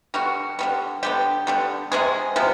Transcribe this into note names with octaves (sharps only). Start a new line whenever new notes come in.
D3 G3 B3 F#4
D3 G3 B3
D3 G3 B3 G4
D3 G3 B3
C3 F3 G#3 B3 G#4
C3 F3 G#3 B3